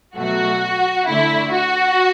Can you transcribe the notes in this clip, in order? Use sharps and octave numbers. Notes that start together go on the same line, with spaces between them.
B2 F#3 A3 F#4
D3 A3 E4
F#4